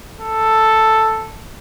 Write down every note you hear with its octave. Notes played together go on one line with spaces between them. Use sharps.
A4